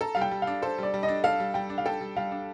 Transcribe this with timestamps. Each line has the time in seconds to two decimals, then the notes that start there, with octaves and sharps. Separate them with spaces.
0.01 A4 A#5
0.15 G3 F5
0.21 G5
0.31 G3
0.42 F5
0.47 D4
0.62 A4 C5
0.78 G3 D5
0.94 G3
1.03 D#5
1.08 D4
1.24 A4 F5
1.40 G3
1.54 G3 G5
1.70 D4
1.78 F5
1.86 A4 G5
2.01 G3
2.16 G3 F5
2.32 D4